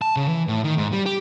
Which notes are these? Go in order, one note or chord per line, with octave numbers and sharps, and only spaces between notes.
A5
C#3
E3
A2
D#3
G#2
G3
G4